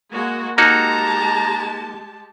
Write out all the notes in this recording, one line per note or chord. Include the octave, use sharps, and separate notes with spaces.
G#3 A#3 F#4
G#3 A#3 D#4 F#4 G4 A5 A#5